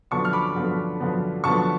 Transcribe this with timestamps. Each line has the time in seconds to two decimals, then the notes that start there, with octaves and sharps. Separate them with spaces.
0.11 F#2 D3 F3 B3 A5 C#6
0.25 F6
0.33 B5 D6
0.56 F#2 D3 F3 B3
1.00 F#2 D3 F3 B3
1.44 F#2 D3 F3 B3 A5 C#6